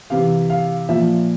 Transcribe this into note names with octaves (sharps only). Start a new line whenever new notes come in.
C3 E3 F5
F5
A#2 F3 E5